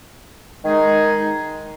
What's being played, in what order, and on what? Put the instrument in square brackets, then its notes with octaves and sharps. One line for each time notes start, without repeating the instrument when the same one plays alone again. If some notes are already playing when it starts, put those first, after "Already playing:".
[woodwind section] D#3 G#3 D#4 G#4